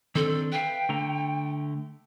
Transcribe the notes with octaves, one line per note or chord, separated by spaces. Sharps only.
D#3 C4 D4 A4
B4 E5 F5 G5
D3 A3 A#5